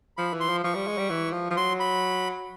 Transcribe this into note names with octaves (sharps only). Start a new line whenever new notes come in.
F3 B5
E3
C6
F3
F3 C#6
G3
G#3
G3
E3
F3
F3
F#3 C6
B5